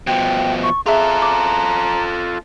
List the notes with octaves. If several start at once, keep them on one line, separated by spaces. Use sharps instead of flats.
B2 F3 G5
C#6
F4 G#4 A4 E5 A#5
D6